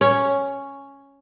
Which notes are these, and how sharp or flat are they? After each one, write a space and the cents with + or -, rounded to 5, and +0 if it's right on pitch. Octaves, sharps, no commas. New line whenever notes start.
C#4 +0 C#5 +0